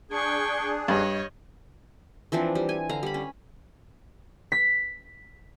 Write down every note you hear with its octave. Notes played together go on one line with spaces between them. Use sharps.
D4 G#4 G5 C#6 G#6
G2 C#5 D#5
E3 F3 C4 D4
G3
G#5
D3 F5 A#5
G3 B5
C#4
B6